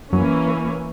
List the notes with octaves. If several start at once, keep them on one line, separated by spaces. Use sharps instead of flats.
F#2 E3 F#3 A#3 C#4